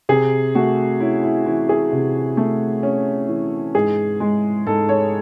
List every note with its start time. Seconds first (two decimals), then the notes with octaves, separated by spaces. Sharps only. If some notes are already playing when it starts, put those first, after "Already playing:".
0.09 C3 G#4
0.55 A3 F#4
1.00 C#4 E4
1.23 E4
1.46 E3 E4
1.69 G#4
1.93 C3
2.37 A3
2.83 C#4
3.29 E3
3.75 G#2 G#4
4.20 G#3
4.66 G#2 A4
4.89 C#5